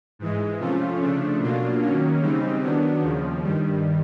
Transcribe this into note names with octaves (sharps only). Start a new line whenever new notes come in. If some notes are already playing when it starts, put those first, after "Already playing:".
G#2 E3 G#3
C3 F3 A3 C#4 F4
C#3 F3 A3 D4
B2 F#3 A#3 D4 F4
D#3 F#3 A#3 C#4
C#3 E3 G3 C4 D#4
D#3 F#3 B3 D4
D#2 C#3 F3
G2 D#3 G3